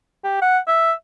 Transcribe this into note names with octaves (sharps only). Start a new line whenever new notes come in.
G4
F#5
E5